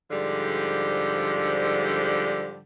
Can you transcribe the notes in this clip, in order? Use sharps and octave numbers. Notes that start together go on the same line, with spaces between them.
G#2 D3 F3 G3